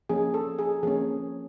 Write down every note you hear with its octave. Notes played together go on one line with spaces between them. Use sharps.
F3 A#3 C#4 G#4
A4
G#4
F3 A#3 C#4 G#4